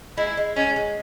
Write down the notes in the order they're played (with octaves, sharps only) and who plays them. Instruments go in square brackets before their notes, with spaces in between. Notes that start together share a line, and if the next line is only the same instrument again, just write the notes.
[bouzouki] G#3 [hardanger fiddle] E4
[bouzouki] G#3
[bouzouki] G#3 [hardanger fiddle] C#4
[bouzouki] G#3